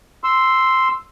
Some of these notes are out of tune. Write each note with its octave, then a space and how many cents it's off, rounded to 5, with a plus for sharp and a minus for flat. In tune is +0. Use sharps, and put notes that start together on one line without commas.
C6 +0 E6 +0